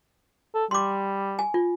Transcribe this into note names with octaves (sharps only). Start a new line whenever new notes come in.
A4
G3 C6 D6
G#5
F4